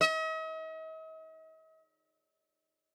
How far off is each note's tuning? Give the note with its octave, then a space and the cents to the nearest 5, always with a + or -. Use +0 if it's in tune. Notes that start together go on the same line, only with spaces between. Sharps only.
D#5 +45